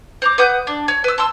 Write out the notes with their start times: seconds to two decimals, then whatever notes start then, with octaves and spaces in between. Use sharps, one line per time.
0.22 C5 A#5 D6
0.38 B4 F#5 D#6 G6
0.67 D4
0.88 C#5
1.04 B4 E6
1.18 A5 C6 E6